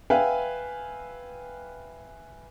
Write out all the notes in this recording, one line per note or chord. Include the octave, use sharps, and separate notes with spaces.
B4 E5 F5 G5 G#5